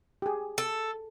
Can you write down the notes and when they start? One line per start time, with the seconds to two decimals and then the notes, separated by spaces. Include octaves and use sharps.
0.22 G4 G#4
0.58 A4